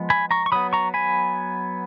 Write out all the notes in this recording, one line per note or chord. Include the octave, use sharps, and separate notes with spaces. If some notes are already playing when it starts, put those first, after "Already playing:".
Already playing: F3 G#3 B3
G#5 B5
A#5 C#6
C#6
F#3 B3 B5 D#6
A#5 C#6
G#5 B5